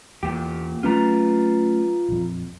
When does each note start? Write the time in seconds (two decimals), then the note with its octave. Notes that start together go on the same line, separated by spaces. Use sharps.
0.23 E2 A#2 A#3 G4
0.83 F#3 A3 C#4 F4 B4 A#5
2.08 A#1 F2